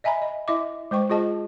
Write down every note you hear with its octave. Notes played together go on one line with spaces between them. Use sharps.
D#5 E5 G#5 A#5 B5
D#5
E4 D#5 E5 D6
G#3 C5 G5 C#6
F4 G#4 D#5 A5